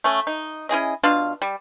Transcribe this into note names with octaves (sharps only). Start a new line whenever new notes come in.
A3 C#4
D#4
C#4 E4 G#4 D#5
B2 D4 F4 F5
G3